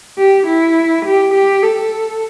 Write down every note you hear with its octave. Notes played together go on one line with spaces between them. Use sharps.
G4
E4
G4
G4
A4